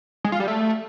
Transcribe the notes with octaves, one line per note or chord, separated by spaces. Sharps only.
G#3
F4
G3
A3